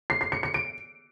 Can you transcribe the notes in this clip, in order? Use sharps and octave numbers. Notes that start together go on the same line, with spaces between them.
C7
C7
C#7
C#7
D7